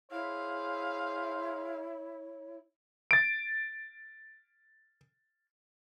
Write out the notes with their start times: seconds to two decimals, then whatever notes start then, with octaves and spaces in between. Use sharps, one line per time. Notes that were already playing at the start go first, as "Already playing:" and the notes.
0.11 E4 G#4 C5 C#5 F5
3.11 A6 D7